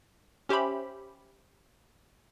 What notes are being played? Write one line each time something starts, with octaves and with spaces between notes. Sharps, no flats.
C#4 G4 C5 E5 B5